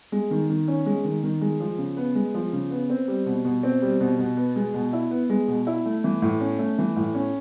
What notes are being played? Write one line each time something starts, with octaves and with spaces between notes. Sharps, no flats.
G#3
D#3
D#3
C#4
G#3
D#3
D#3
G#3
F3
C#3
B3
G#3
F3
C#3
B3
C4
G3
B2
B2
C4
G3
B2
B2
B3
G#3
B2
E4
B3
G#3
B2
E4
A3
E3
A2
C#4
A3
E3
A2
C#4